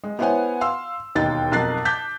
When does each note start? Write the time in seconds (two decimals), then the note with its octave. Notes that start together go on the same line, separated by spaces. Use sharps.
0.04 G#3
0.19 B3 E4 C5 C#5 F#5 G#5
0.61 F5 C6 E6
1.15 E1 D#2 D#4 G5 A6
1.52 B1 F2 A#4 F#6 A6 C7
1.85 A5 D6 G6 B6